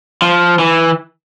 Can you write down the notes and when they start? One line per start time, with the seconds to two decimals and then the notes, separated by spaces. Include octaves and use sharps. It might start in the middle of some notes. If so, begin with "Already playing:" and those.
0.22 F3
0.59 E3